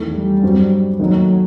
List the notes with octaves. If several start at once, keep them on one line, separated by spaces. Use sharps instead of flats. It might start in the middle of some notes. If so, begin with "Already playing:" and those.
Already playing: E2 D#3 A3
G3
G2 F#3 C4
D#2 D#3 F#3 A3 D#4